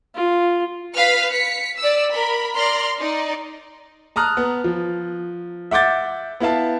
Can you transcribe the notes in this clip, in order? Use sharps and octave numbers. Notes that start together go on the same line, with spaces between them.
F4
B4 F5 F6 B6
B6 C#7
D5 E6
A#4 B5
D5 A#5 C6 F6
D#4 D5
A5 A#5 D#6 F6 F#6
B3
F3
E5 F#5 D6 G6 A6
B3 E4 E5 F5 A5